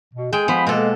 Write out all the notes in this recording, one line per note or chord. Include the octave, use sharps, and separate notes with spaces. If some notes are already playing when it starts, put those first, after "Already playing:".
B2
G#3 G#4 G5
F3 B3 B5
B2 G#3 A#3 A4